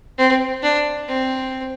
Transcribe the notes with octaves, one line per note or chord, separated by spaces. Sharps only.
C4
D4
C4